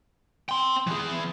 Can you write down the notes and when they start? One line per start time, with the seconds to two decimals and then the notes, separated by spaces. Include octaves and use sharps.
0.49 G5 C6
0.87 E3 G#4